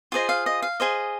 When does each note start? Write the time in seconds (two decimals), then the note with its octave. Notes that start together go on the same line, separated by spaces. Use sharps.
0.12 F4 G#4 C5 D#5
0.29 F5
0.46 D#5
0.62 F5
0.80 G#4 C5 D#5